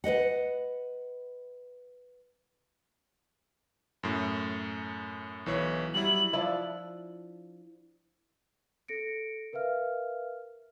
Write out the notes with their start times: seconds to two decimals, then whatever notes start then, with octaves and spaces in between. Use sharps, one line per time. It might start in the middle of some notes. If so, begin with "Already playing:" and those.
0.04 B4 C5 D#5 F#5
4.03 F#2 A2
5.46 B1 E3 C#5
5.94 F#3 G3 E4 F#7
6.33 F3 D4 E4
8.88 A4 A#6 C#7 D7
9.53 A#4 B4 E5 F5 F6